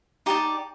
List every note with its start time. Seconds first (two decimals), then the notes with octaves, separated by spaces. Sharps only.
0.26 D#4 G4 D5 A5